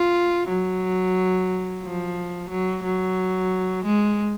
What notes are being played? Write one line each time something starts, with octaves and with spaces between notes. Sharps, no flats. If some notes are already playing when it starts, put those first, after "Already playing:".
Already playing: F4
F#3
F3
F#3
F#3
G#3